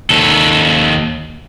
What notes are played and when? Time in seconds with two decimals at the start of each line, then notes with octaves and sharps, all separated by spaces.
0.10 D#2 A4